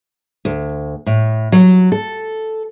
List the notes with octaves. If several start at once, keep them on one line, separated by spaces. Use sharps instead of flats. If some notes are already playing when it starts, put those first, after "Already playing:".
D2
A2
F#3
A4